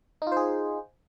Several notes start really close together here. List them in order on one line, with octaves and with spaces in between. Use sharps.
D#4 F4 C5 G#4